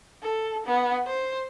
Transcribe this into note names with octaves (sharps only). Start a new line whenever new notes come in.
A4
B3
C5